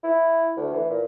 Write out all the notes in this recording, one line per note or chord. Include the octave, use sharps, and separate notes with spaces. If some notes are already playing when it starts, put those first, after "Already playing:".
E4
D2
E3
A#2